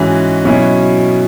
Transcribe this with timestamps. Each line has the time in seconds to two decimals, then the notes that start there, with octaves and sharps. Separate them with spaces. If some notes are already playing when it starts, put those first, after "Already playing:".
Already playing: G#2 E3 C#4 F#4
0.45 B2 F#3 C#4 E4